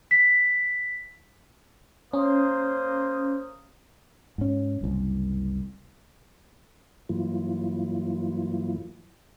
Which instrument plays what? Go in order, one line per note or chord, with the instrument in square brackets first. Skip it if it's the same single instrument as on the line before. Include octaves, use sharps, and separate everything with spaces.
[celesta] B6
[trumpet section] A#3 C5 D#6 [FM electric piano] C#4
[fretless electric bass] G#2 C#4
F#1 C2
[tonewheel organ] G2 E3 F#3 A#3 E4 F4